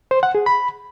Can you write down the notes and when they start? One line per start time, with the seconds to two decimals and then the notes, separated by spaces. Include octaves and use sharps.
0.11 C5
0.23 F#5
0.35 G#4
0.46 B5